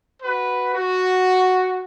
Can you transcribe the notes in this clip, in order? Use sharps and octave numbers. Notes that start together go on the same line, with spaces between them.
F#4 B4
F#4